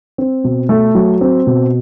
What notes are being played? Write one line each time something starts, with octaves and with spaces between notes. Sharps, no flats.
C4
B2
A3
F#3
C4
B2